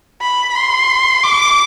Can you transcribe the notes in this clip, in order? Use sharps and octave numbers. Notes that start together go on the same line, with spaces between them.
B5
C6
D6